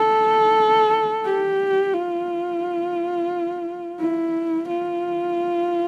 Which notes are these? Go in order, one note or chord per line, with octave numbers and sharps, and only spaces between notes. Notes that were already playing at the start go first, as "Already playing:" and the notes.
Already playing: A4
G4
F4
E4
F4